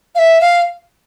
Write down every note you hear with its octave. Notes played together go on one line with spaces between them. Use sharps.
F5
E5
F5